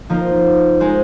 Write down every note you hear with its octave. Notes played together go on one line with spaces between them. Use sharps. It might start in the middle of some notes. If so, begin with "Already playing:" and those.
F3 A#3 D#4 C5
G#3 D#4 C5